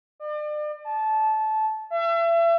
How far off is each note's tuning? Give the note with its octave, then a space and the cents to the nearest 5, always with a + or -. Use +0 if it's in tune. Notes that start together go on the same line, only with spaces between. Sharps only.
D5 +40
A5 -20
E5 +35